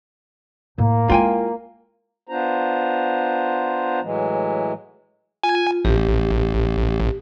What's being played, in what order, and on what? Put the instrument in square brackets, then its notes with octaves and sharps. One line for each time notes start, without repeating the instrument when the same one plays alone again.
[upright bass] A2 [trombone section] A#3
[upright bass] G#3 E4 [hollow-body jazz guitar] F4 G5 G#5
[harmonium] B3 D4 F4 C5 A#5
A2 E3 F#3 G#3
[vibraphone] F4 [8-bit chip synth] G#5
[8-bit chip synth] A1 [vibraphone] G4